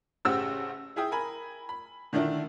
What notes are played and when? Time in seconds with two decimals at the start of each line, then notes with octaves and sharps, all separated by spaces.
0.25 A1 C#3 G4 C5 F#5 E6
0.96 E4 G#4 E5 G5 D#6
1.11 A#4 G#5 B5
1.69 B5
2.13 D3 D#3 A3 D4 E4